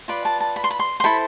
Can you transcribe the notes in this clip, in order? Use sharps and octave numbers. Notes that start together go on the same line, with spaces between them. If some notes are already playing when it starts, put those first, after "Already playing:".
F4 B4 D5 B5
A5
A5
B5
C6
B5
C6
C6
E4 A4 C5 B5